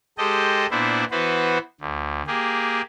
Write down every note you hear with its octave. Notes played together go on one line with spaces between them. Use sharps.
G#3 G4 A4 C5 D#5
A#2 B3 D4 E4 C5
E3 B3 F#4 B4 C5
D2
A#3 G4 G#4